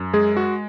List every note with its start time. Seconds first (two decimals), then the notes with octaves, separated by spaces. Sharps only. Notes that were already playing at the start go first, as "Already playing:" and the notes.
Already playing: F#2
0.14 G#3 G#4
0.37 F#4